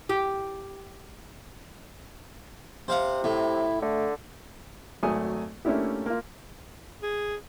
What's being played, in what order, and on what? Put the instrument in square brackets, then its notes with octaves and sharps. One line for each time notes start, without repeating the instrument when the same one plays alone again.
[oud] G4
[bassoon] C3 [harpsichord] C5 F5 F#5
[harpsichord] A2 [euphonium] E4
[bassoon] D3 [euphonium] A3
[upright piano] G#1 F#3 A3 G#5 D#6
A3 A#3 C#4 D4 E4 G4
A#3 F4
[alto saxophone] G#4